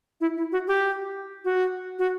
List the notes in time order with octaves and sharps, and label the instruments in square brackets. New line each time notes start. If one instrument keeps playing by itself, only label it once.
[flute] E4
E4
F#4
G4
F#4
F#4